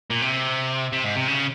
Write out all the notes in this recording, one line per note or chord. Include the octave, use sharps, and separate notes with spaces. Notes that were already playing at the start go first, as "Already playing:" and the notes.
A#2
C3
C3
G#2
C3
C#3